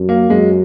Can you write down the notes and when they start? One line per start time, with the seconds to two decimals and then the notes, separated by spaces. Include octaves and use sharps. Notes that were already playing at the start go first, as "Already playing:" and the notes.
Already playing: F#2
0.09 A#3
0.30 F#2 G#3